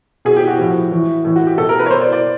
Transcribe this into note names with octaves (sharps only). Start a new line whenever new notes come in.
B2 G#4
G4
F#4
A2 F3
A2 E3
A2 E3
F#4
G4
B2 A4
A#4
B4
C#5
B2 C5
D5
D5